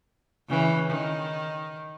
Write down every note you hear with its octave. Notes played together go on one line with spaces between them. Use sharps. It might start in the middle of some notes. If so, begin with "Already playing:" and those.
C#3 E3
D#3